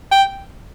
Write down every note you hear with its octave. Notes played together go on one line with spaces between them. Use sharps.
G5